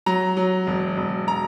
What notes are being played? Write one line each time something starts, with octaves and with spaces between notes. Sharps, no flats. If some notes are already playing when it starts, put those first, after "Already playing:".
F#3 A#5
F#3
E1
E1
A#5